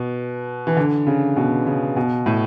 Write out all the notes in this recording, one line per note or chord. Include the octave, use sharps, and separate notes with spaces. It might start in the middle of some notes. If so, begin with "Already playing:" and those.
Already playing: B2
E3
D3
C#3
B2
C#3
B2
A2